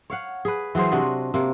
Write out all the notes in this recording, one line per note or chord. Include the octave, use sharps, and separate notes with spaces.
C#5 F5 F#5
G#4 B4
E3 F#3 G#4 C5
C3 D4 F#4 D#5
C3 A#3